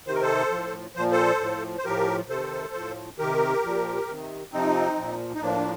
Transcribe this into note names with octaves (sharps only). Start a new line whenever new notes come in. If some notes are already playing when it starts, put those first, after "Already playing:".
C3 D#3 C5
A#4
A4 C5
A2 F3
A#2 F3 C5
A4 C5
A2 F3
C5
A2 F3 G4 A#4
C3 D#3 A4 C5
A2 F3
C3 D#3 G4 A#4
A#2 F3
C3 D#3
C3 F3 C4 D#4
A#2 F3
D#4
A2 F3 A#3 D4